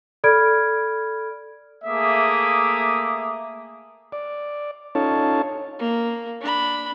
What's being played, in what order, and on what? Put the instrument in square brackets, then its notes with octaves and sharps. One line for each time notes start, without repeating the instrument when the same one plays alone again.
[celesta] A4 D5 B5 F6 G#6 D7
[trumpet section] A3 A#3 G#4 E5 D6 D#6
[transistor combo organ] D5
C#4 D#4 F4 A4 C#5 A5
[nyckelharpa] A#3
D4 B5